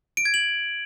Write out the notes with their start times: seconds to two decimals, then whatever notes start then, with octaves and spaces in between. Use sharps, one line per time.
0.17 D7
0.25 G#6
0.34 F#7